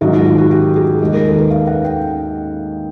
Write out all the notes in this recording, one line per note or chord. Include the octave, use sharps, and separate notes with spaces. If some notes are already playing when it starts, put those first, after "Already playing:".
G#2 D#3 F#3 F#4
F4
F4
F#4
G4
G#4
D#2 D#3 G#3
A#4
A4
B4
F5
F#5
G5